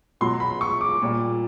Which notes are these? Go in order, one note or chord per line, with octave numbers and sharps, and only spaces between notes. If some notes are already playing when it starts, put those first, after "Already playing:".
B2 F#3 C6
B5
C#6
D6
A#2 G3